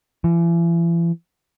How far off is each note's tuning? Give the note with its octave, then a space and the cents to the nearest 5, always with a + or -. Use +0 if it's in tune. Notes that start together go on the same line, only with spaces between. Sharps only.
E3 +40